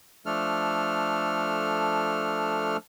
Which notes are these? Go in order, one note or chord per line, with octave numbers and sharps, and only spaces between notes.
F3 A3 D4 A4 F6